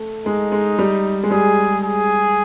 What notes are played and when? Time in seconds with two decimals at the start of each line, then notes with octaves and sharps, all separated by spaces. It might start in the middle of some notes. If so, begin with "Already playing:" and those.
Already playing: A3
0.26 G#3 D#4
0.52 G#3
0.79 G3
1.23 G#3
1.31 G3 G#4
1.83 G#4